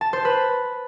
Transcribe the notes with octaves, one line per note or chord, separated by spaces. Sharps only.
A5
C5
B4